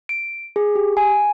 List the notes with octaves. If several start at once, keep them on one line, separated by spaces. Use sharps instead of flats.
D7
G#4
G4
G#5